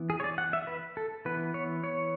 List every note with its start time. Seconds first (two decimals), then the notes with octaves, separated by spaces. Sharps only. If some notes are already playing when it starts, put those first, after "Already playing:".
Already playing: E3 B3
0.10 G#4
0.20 C#5
0.24 D5
0.38 F#5
0.53 E5
0.67 B4
0.97 A4
1.25 E3 B3 B4
1.54 C#5
1.84 C#5